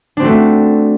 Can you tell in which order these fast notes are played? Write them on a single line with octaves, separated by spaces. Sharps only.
D4 C4 F#4 A3